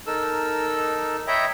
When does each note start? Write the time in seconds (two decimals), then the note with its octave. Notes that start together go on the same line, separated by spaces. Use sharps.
0.07 D#4 A4 A#4 E6
1.27 C#5 D#5 E5 G5 A#5 B5